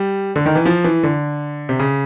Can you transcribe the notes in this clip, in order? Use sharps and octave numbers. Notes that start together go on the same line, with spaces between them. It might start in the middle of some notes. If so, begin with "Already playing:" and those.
Already playing: G3
D3
D#3
E3
F3
E3
D3
C3
C#3